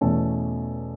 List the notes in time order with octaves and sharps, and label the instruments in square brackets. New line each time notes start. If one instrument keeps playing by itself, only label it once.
[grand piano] E2 B2 A3 C#4 A4